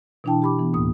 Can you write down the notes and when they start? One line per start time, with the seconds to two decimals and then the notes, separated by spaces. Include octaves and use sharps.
0.24 B2 E3 D4 E4 G5 A5
0.42 G4 B5 D6
0.59 E3 B3
0.73 D2 A2 A#3 D#6